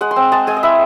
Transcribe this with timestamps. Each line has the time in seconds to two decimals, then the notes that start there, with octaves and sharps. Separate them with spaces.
0.01 G#3 F#5
0.11 C6
0.16 C4
0.32 G#3 A5
0.47 G#3 G#5
0.57 D#5
0.63 E4 E5